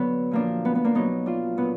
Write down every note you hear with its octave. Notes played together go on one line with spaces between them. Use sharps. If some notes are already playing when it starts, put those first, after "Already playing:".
Already playing: D3 F#3 B3
A#2 F3 A#3 D4
B3
B3
A#3 D4
B2 F#3 B3 D#4
D4 F4
A#2 F#3 B3